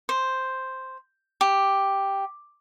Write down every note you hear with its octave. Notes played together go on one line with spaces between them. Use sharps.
C5
G4